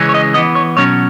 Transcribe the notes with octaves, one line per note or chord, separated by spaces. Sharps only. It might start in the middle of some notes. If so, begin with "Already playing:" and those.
Already playing: C#3 E3 G#3 C#4
C#5
D#5
E3 B3 D#5
C#5
B2 F#3 C#4 C#5